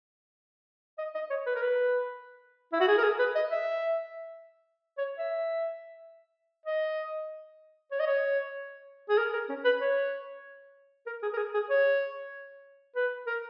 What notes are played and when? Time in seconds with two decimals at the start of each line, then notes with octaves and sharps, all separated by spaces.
0.98 D#5
1.14 D#5
1.30 C#5
1.46 B4
1.56 A#4
1.62 B4
2.72 E4
2.80 F#4
2.88 G#4
2.98 A#4
3.04 G#4
3.19 B4
3.35 D#5
3.51 E5
4.98 C#5
5.18 E5
6.66 D#5
7.91 C#5
7.99 D#5
8.07 C#5
9.09 G#4
9.18 A#4
9.33 A#4
9.49 C#4
9.65 B4
9.81 C#5
11.06 A#4
11.22 G#4
11.33 A#4
11.37 G#4
11.54 G#4
11.70 C#5
12.96 B4
13.26 A#4